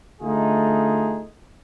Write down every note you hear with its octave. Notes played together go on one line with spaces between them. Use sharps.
D3 A3 D#4 F4 G#4